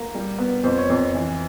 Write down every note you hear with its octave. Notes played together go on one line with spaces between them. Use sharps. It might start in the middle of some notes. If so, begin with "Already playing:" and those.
Already playing: A#3
G3
B3
F2 C5
C#5
F2 C5
E3